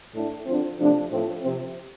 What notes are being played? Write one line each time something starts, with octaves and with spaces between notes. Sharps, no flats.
A2 A3 D4
D3 F3 C4
C3 F3 A3 D4
A2 F3 C4
C3 F3 C4